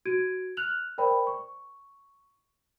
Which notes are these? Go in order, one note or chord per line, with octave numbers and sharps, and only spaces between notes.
F#4 G#6 D7 D#7
F6 F#6 F7 F#7
A#4 C5 D5 G5 B5
C#6